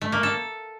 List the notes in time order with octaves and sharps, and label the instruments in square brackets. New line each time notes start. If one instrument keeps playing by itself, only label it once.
[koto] A3
A#3
A4